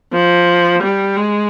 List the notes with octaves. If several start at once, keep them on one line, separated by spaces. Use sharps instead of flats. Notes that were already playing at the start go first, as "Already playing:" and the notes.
F3
G3
G#3